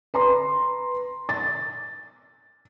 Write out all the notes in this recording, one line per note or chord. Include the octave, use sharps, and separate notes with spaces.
B4 A#5 C6
A6